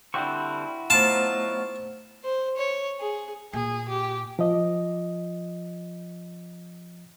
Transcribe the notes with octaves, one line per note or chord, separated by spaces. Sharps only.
D3 G3 C4 E4 F#4 C#6
F#3 A3 B3 D#4 F4 C5 A5
C5
C#5
G#4
A#2 G#4
G4
F3 D#5